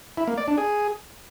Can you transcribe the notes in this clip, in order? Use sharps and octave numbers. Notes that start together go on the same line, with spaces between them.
E4
A#3
D5
D4
G#4